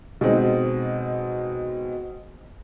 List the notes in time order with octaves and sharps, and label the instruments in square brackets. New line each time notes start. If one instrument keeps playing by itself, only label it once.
[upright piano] B2 G#3 C4 D#4